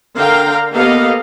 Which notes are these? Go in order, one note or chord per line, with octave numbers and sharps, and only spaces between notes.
D3 A#4 F5 G5 A#5
A#3 B3 G4 A4 D#5 F5